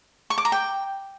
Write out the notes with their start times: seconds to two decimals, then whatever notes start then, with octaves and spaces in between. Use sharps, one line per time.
0.30 C#6
0.38 D6
0.45 A#5
0.52 G5